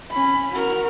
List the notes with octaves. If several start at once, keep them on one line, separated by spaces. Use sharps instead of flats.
C#4 B5
F#4 A#4